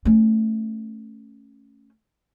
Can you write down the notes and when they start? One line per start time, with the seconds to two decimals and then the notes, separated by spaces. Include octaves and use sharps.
0.05 A3 C#4